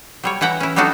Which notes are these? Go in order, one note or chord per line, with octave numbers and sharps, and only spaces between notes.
F#3 G3 C#5
E3 E4 F#5 G5 A#5
C#4 E4
F#3 G3 D4 D#4 F#4 A4